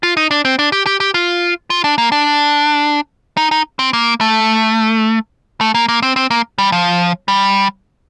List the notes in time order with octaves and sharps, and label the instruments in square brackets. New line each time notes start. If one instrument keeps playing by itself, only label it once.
[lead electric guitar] F4
D#4
D4
C4
D4
G4
G4
G4
F4
F4
D4
A#3
D4
D#4
D#4
C4
A#3
A3
A3
A#3
A#3
C4
C4
A#3
G3
F3
G3